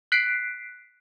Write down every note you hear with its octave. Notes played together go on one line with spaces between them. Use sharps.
F#6 B6 C7 D7